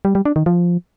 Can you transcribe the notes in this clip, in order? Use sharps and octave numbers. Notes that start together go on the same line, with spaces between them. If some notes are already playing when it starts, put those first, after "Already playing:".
G3
G3
D4
D#3
F3